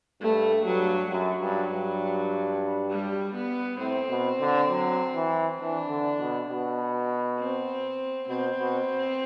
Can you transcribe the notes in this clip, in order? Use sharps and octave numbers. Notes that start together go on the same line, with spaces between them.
G2 A3
G2 F#3
F#2 F#3
G2
G2
G3
B3
A2 C4
B2
D3
F#3
E3
E3 D4
D3
B2
B2
C4
B2 C4
B2